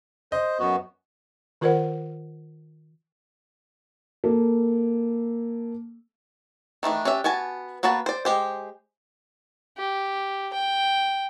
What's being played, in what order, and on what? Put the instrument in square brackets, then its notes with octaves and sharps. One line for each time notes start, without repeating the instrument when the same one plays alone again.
[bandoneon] C5 [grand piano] D#5
[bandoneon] F#2 B3 F#4
[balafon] D#3 F4 A#4 C5 D5 F#5
[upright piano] A#3 A4
[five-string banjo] D#3 E3 A3 D4
C#4 D4 G4 E5
B3 F#4 G#5 A5
A#3 B3 F#4 B4 A5
C5 D5
G#3 G4 C5
[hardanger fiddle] G4
G5